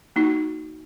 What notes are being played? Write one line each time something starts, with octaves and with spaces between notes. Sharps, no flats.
A#3 D#4 F#4